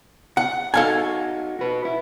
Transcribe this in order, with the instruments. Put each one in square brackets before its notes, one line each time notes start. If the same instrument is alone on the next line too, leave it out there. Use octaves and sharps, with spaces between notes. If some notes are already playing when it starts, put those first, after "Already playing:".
[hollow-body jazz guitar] F#5
[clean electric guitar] D#4 F#4 [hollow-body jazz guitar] A4 F5 G#5
[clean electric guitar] F#4 B4
E4